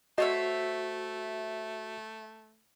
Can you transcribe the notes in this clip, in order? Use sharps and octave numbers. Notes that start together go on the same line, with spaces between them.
A3 F#4 C5 C#5 D#5 E5 A6 D#7